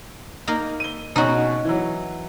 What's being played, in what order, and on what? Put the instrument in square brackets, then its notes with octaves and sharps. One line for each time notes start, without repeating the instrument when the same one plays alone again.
[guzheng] A#3 D#4 A#4
[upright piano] D#7 G7
[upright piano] B2 C#4 [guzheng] D#4 F#4 G#4
[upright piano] E3 F#3